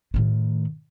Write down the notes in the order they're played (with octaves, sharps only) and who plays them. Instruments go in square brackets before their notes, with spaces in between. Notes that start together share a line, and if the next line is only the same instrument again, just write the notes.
[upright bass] A2 D#3